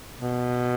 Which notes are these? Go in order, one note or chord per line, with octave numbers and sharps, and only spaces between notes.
B2